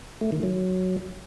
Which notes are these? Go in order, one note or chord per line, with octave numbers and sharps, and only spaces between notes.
A3
D#3
F#3